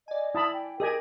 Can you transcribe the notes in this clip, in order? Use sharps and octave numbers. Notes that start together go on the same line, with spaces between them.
D5 D#5 G#5
E4 A5 B5 D#6
G5
G4 G#4 A#4 D#5 G#5